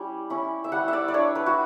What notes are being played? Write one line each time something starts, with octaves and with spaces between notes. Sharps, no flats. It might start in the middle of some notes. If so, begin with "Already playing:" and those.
Already playing: G3 C#4 E4 G4
C#4 E4
E5
G3 F#5
E5
D5
D5
D4 C#5
B4
F#4